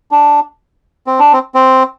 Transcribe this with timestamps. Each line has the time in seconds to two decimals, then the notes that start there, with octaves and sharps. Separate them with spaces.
0.11 D4
1.07 C4
1.20 D4
1.33 C4
1.55 C4